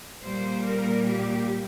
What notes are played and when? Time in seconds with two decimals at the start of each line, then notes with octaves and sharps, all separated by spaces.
0.22 A#2 G3 A#3 C5
0.63 A#4
1.04 G4